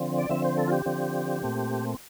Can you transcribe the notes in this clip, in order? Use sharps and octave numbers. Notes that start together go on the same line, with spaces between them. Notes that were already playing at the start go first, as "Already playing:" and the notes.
Already playing: D3 F3 C4
D5
D3 F3 C4 E5
C5
A4
F4
G4
D3 F3 C4
A#2 A3 C4